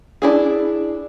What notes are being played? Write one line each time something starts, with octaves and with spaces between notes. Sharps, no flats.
D4 E4 G#4